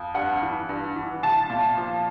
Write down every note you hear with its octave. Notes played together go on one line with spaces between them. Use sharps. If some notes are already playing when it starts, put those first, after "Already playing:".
Already playing: F2
G2 F#5
E3
G2
E3
C2 A5
A#2
F3